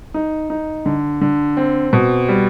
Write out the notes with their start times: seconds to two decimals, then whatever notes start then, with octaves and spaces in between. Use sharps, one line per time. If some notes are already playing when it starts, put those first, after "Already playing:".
0.14 D#4
0.50 D#4
0.86 D3
1.21 D3
1.57 C4
1.93 B2
2.28 G3